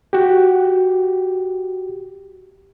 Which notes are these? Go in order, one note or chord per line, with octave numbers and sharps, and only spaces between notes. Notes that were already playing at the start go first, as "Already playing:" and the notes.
F#4 G4